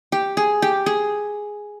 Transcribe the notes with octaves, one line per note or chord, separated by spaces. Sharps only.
G4
G#4
G4
G#4